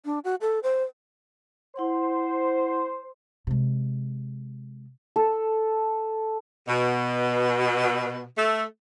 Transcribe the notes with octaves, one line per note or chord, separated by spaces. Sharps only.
D4
F#4
A4
C5
E4 C5 F#5 C6
C3 G#3
A4
B2
A3